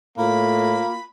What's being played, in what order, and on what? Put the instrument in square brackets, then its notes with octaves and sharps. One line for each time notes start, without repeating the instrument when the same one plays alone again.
[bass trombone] A2 [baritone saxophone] A#3 [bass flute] F4 [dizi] B5